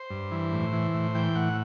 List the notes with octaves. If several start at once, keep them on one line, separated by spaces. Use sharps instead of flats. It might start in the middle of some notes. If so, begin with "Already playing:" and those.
Already playing: C5
G2
E3
A2
E3
A2
E3 G5
A2 F#5